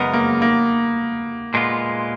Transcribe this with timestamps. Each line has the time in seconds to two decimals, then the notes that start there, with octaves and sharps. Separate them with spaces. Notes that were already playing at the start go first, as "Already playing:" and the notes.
Already playing: F#2 C#3 G#3 B3 D#4 A#4
0.13 A#3
0.42 A#3
1.54 A#2 G#3 B3 F4